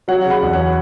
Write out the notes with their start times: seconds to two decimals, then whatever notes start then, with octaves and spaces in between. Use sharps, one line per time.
0.08 F#3 C#5 F#5
0.25 C#3
0.30 F#5 B5
0.43 E2
0.53 C#5 F#5